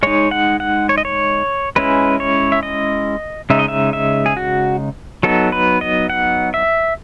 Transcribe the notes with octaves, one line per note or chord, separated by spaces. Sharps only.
G#3 D#4 C#5
F#5
F#5
C#5
D#5
C#5
G#3 C#4 E4 B4
C#5
E5
D#5
C#3 G#3 D#4 E5
D#5
E5
E5
G#4
F#4
F#3 B3 D#4 A4
B4
D#5
F#5
E5